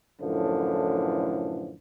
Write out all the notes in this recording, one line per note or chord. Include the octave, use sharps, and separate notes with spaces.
F#2 A2 D3 E3 F3